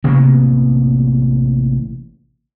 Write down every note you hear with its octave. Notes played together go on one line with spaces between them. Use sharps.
A1 C3 A#3 B3